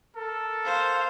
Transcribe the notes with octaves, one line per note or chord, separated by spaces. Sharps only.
A4 A#4
C5 F5